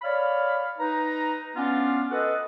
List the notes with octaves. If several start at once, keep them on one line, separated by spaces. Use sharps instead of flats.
C#5 D5 F5 B5
D#4 B4 A#5
B3 C#4 D4 F4
A4 B4 D#5 F#5